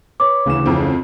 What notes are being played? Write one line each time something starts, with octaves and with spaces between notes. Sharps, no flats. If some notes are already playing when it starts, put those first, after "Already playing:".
B4 C#5 D6
D2 C#3 E3 E7
F2 C4